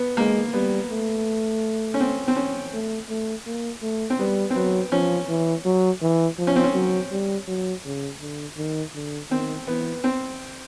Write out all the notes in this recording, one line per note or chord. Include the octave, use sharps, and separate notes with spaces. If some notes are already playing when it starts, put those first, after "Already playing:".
Already playing: B3
G#3 A#3
G3 B3
A3
C#4
C4
C4
C#4
A3
A3
A#3
A3
C4
G3 B3
C4
F#3 B3
F3 C#4
E3
F#3
E3
F3
C#4
C4
C#4
F#3
G3
F#3
C#3
D3
D#3
D3
D#3 C4
E3 B3
C4